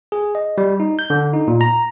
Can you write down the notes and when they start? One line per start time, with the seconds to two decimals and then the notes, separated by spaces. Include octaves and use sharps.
0.12 G#4
0.35 D#5
0.58 G3
0.80 D#4
0.99 G6
1.10 D3
1.33 D#4
1.48 A#2
1.61 A#5